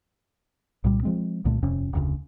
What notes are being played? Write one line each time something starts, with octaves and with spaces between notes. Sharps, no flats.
C2 A#2 G3
F3 G#3 C4
C2 A#2 D3 A3
D#1 F2 C3 C#4
F1 D2 C#3